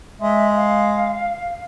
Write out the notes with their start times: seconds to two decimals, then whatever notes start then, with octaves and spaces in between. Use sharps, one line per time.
0.20 G#3 E5
0.56 F5